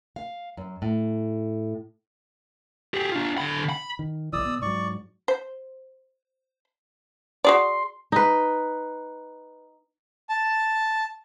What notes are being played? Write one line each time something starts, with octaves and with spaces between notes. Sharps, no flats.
F5
F#2
A2
G4 G#4
D4 F4
D3 B5
B5
D#3
B1 E3 D5 D#6 E6
B2
G#2 F#3 D5 C#6
C5
F#4 G#4 D5 C6
D#4 B4
A5